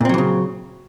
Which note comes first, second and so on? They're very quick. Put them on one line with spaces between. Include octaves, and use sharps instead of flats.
A#2 C4 F#3 E3 C#3